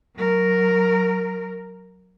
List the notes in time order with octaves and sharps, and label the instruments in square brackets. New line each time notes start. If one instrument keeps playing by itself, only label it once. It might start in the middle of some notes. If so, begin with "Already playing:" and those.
[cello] F#3 A#4